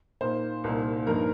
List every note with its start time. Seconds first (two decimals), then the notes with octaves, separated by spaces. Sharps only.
0.21 A#2 A#3 D#4 C5
0.64 C2 A#2 A#3 D#4
1.06 G2 F3 A#3 D#4 A#4